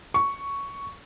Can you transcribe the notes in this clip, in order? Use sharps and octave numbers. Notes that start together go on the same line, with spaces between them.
C#6